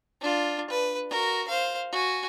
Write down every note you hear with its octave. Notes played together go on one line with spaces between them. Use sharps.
D4 F4
B4
F#4 A#4
C5 F5
F#4 G#5